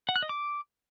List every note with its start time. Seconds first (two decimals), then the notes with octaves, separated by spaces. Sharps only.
0.09 F#5
0.16 F#6
0.23 D#5
0.29 D6